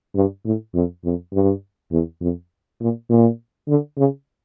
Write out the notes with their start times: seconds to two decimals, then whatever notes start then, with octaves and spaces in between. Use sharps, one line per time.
0.15 G2
0.45 A2
0.74 F2
1.05 F2
1.33 G2
1.92 E2
2.21 F2
2.81 A#2
3.09 A#2
3.68 D3
3.97 C#3